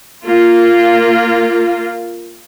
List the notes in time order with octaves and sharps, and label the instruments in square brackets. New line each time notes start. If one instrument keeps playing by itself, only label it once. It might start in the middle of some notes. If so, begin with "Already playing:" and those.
[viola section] A#3 F4